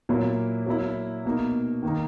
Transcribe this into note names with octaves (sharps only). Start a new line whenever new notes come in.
A#2 F#3 A#3 E4
F#3 A#3 E4
B2 A#3 D#4
D#3 A#3 D#4